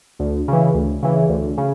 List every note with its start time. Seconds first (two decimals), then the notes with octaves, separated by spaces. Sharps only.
0.19 D2
0.48 C#3 E3
0.74 D2
1.02 C#3 E3
1.29 D2
1.58 C#3